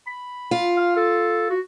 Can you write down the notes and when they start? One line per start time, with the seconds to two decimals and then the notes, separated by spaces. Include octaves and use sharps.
0.07 B5
0.51 F4
0.77 F5
0.97 A4
1.50 F#4